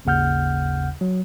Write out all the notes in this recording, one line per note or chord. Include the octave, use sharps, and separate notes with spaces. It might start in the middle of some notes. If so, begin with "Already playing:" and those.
G#1 D#2 C#3 F#5 F6 G6
F#3